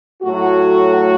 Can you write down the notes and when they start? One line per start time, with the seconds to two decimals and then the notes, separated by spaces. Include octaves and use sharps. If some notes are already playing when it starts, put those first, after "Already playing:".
0.23 A2 F#3 A3 F#4